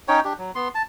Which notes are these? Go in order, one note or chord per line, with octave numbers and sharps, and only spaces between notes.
C#4 D#4 C#5 G5
D4 G4
F#3
B3 C6
A5